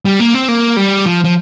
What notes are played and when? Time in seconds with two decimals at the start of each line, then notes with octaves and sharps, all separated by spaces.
0.05 G3
0.20 A#3
0.34 C4
0.48 A#3
0.77 G3
1.06 F3
1.24 F3